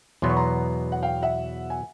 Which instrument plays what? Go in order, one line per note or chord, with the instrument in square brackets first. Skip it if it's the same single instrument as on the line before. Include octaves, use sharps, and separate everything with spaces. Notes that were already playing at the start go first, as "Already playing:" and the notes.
[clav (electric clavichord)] E2 B2 F#3 B3 [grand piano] C6
[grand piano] C#6
A#5 C6
F#5
F5 G5
E5 F#5
G#5